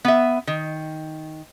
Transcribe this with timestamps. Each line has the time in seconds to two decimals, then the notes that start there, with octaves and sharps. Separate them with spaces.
0.05 B3 E5
0.47 D#3